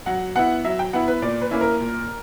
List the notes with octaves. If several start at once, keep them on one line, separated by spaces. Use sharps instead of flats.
F#3 F#5
B3 E4 F#5
F#3 E5
G5
B3 E4 F#5
B4
A#2 D5
B4
A#3 C#4 E4
A#4
A#2